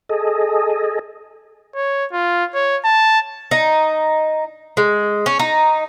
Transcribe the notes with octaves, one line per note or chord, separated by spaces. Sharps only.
G#4 A4 D#5
C#5
F4
C#5
A5
D#4
G#3
C#4
D#4